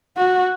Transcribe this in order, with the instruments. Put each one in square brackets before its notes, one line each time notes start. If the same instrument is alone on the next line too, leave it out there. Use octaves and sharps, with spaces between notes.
[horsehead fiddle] F#4